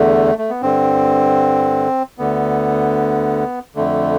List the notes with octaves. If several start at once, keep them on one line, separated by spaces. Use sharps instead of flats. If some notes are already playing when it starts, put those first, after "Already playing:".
Already playing: E2 D3 A3
A3
B3
G2 D3 C4
D2 D3 B3
F2 D3 A3